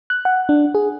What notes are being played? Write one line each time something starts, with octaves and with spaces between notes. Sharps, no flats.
F#6
F#5
D4
G#4